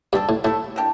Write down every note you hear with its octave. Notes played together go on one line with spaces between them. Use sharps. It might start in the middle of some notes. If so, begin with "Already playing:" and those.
G2 G3 D4 A4
A2
A2 A3 E4 A4
A#3 D4 G4